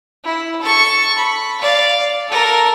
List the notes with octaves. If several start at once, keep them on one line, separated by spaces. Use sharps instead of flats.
E4
A4 C#6
B5
D5 F5
A4 A#4